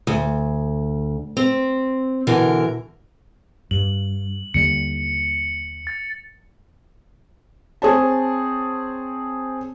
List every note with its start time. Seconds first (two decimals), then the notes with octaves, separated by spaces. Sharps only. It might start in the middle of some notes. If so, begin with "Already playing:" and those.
0.07 D2
1.37 C4
2.27 B2 D3 E3 A#4
3.71 G2 F#7
4.54 D#2 D3 G3 C#7
5.87 A6
7.82 C4 G#4 C#5 A5